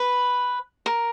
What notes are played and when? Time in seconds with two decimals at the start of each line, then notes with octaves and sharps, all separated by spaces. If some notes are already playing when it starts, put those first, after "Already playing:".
Already playing: B4
0.86 A#4